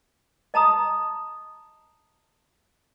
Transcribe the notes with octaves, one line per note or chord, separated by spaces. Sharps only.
D#5 A5 A#5 D#6